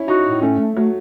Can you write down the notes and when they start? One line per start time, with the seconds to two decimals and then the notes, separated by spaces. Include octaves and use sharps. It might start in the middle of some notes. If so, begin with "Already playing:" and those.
Already playing: C#4 E4
0.08 D#4 F#4
0.25 A2
0.42 A3 C#4
0.59 A3
0.76 F#3 A3